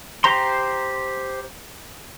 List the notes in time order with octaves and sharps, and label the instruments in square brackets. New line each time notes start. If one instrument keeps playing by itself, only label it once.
[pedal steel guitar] G4 C5 A#5 C6